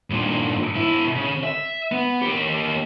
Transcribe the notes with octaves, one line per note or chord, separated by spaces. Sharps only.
G2 A#2
B2 E4
C#3
E5
B3
A#3 G4